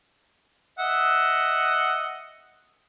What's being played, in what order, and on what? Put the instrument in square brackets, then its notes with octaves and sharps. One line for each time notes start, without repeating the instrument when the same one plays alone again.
[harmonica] D#5 E5 F#5